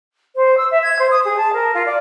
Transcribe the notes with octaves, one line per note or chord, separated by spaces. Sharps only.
C5
E6
E5
G#6
C5
D#6
G#4
A5
A#4
F4
D5